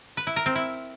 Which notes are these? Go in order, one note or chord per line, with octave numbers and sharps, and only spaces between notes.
B4
E4
A#4
C4
E4